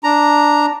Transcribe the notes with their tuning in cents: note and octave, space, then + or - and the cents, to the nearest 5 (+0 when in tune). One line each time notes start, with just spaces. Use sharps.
D4 +0 A#5 +0